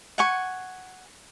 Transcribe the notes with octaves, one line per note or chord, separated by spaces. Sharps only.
F#5 G#5 C#6